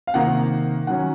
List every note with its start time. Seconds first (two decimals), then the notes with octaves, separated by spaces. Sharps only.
0.07 F5
0.14 C3 D#3 A#3 D#4 F#5
0.87 D#3 F#3 C#4 F#5